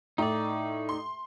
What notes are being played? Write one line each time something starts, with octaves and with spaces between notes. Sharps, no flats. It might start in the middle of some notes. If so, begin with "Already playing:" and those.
A2 D#4 D5
C6